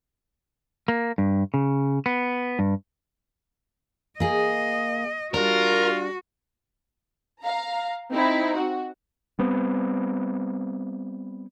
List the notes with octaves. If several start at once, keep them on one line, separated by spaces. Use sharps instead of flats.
A#3
G2
C#3
B3
G2
A#3 G#4 D#5
G3 D4 F4 F#4 A#4
F5 A#5
C4 D#4 E4
F#4
G3 B3 C4